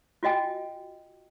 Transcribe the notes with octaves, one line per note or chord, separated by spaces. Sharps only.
F4 F#4 D#5 G5 G#5